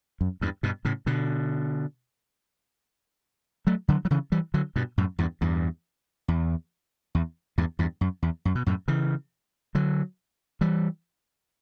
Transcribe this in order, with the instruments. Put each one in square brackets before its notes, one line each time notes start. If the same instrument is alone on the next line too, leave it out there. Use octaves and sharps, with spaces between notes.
[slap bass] F#2
E2 G2
G2 B2
A2 C#3
B2 D3
F#3 A3
D3 F#3
F#3
C#3 E3
E3 G3
D3 F#3
G2 B2
F#2 A2
E2 G2
E2 G2
E2
E2
E2 G2
E2 G2
F#2
E2
F#2
B2
F#2 A2
C#3 E3
D3 F#3
E3 G3